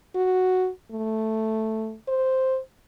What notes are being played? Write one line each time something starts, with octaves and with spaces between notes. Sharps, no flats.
F#4
A3
C5